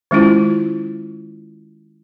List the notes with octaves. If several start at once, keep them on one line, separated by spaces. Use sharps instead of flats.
D#3 G#3 C#4 E4 F4